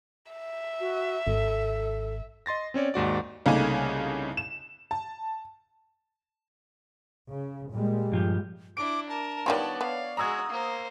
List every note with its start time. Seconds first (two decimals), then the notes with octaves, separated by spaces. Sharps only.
0.32 E5
0.80 F#4
1.27 G#1 A4
2.46 D#5 C6 A6 A#6
2.74 C4 C#4 C#5 D5
2.94 D#2 G#2 F#4 D5
3.46 C2 C#3 A3 A#3 D#4 G#5
4.37 E7
4.91 A5
7.31 C#3
7.73 A#2 G3 G#3
8.12 G2 F3 G4
8.77 D4 E4 D6 D7
9.09 A#4 A5
9.46 D#3 G3 B3 F4 C#5 D5
9.81 B3 F5
10.17 G#3 F#4 A#5 D#6 E6 G#6
10.49 A#3 C5